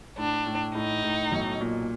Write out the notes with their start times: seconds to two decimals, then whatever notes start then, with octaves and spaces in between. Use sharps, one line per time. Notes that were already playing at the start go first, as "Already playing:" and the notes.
0.18 A2 D4
0.46 A2
0.75 A2 D#4
1.03 A2
1.32 B1
1.61 A#2